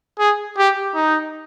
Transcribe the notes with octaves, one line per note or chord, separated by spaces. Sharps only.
G#4
G4
D#4